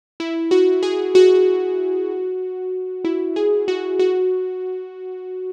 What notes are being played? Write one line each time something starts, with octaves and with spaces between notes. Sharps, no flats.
E4
F#4
G#4
F#4
E4
G#4
F#4
F#4